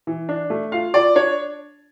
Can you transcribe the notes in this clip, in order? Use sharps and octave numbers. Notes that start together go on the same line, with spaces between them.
E3
D4
A3
F4 F5
F4 D5
D4 C#5